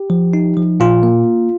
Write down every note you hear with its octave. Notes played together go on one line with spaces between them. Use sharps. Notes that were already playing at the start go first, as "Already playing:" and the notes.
Already playing: G4
F3
D#4
F3
A#2 F4
A#3